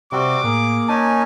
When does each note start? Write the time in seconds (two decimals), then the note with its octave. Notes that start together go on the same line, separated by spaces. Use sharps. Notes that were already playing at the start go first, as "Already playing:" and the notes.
0.12 C3 G3 C4 F#4 D6
0.44 A2 A#3 G#4
0.89 C#4 D#4 G#5 A5